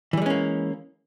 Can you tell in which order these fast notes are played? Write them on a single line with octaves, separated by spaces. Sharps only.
E3 G3 G#3 C#4 A#3